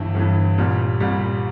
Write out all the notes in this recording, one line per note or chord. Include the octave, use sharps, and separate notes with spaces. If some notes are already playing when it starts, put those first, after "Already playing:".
Already playing: G1 G2 E3
G1 G2 E3
C2 A#2 G3
C2 A#2 G3